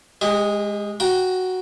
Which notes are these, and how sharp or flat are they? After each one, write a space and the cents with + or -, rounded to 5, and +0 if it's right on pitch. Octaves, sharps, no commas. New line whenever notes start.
G#3 +0 G4 +35 D#5 +0
F#4 +0 G5 +0 A#5 +25